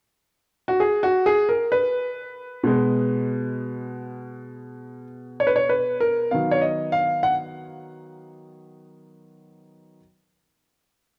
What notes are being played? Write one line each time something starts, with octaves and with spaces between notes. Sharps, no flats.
F#4
G#4
F#4
G#4
A#4
B4
B2 G#3 B3
C#5
B4
C#5
B4
A#4
D#3 F#3 B3 F5
C#5
D#5
F5
F#5